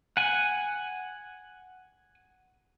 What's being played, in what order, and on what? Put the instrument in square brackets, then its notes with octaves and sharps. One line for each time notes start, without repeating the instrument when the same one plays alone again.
[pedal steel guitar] F#5 G#5